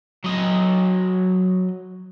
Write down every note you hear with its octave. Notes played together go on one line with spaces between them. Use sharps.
F#3 D#5